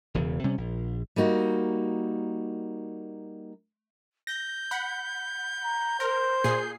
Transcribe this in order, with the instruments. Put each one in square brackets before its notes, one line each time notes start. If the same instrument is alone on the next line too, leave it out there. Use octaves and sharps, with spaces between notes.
[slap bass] E1 E2 C#3
C3 G3 C#4
A#1
[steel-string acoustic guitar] G3 A#3 D#4 F#4
[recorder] G6 [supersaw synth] A#6
[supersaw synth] F#5 B5
[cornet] A#5
[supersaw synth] A#4 [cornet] C5
[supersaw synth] A#2 G#4 C7